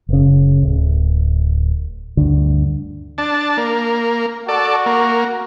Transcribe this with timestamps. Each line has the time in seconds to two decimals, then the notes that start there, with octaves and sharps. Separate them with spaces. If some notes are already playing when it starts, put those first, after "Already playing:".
0.09 F#1 C#3
0.63 D1
2.17 D2 G2 D3
3.18 D4 A5
3.57 A#3
4.48 F#4 A4 D5
4.86 A#3